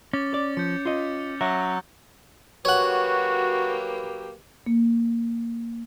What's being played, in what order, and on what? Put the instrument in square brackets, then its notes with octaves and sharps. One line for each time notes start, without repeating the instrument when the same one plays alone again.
[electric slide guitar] C#4 [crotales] D6 A6
[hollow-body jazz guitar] D5
[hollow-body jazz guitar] F3 [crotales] G6 C#7
[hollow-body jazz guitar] F4 D#5
[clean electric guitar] F#3 [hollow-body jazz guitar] E5 [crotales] E6 F#6 A#6
[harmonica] F#3 A#3 G4 [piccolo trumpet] F#4 [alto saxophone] B4 [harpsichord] C#5 F#5
[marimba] A#3